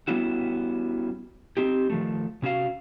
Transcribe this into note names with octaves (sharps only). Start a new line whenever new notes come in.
G3 B3 C#4 E4 F#4
C4 D#4 G4
D#3 F3 A3
C3 C#4 F#4 F5